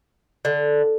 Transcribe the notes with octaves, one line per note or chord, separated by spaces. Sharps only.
D3